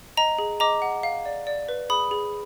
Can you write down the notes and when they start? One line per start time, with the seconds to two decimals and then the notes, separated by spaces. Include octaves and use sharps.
0.17 D#5 A#5
0.39 G#4
0.60 D#5 A#5 D6
0.82 F#5
1.03 F5
1.25 D5
1.47 D5
1.69 B4
1.90 G#4 B5 D#6
2.11 G#4